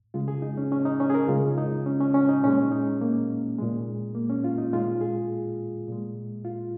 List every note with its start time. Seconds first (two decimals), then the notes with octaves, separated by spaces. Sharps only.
0.14 C#3 G#3 F4
0.28 G#4
0.42 D#4
0.57 C#4
0.72 C#4
0.85 D#4
1.00 C#4
1.10 G#4
1.15 A#4
1.28 C#3 G#3 F4
1.58 D#4
1.86 C#4
2.00 C#4
2.14 C#4
2.29 D#4
2.43 A#2 G#3 C#4
2.71 D#4
3.01 A#3
3.59 A#2 G#3
4.15 A#3
4.29 C#4
4.44 F4
4.58 D#4
4.73 A#2 G#3 F4
5.01 G#4
5.88 A#2 G#3
6.45 F4